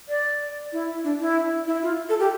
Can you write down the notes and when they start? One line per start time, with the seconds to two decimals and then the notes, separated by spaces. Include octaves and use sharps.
0.09 D5
0.73 E4
1.04 D4
1.20 E4
1.67 E4
1.83 F4
2.09 A4
2.20 G4